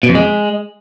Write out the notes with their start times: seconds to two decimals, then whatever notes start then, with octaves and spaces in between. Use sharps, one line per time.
0.03 B2
0.09 F2
0.15 G#3